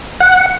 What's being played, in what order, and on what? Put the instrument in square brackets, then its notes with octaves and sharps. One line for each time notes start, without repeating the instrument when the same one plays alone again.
[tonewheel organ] F#5